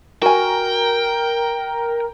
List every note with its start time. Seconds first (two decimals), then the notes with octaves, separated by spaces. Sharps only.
0.22 F#4 A#4 G5 G#5